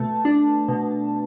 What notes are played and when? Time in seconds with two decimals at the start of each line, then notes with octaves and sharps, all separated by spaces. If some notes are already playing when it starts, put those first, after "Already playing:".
Already playing: B2 A3 A5
0.25 D4
0.68 B2